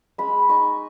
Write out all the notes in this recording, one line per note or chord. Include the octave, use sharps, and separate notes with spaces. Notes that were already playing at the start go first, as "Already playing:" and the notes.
G#3 B5
D#4 C#6